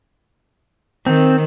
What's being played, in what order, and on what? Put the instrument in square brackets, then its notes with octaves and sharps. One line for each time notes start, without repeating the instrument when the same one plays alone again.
[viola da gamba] D#3 [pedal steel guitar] C4